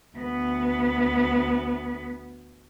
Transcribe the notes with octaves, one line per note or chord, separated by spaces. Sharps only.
D2 B3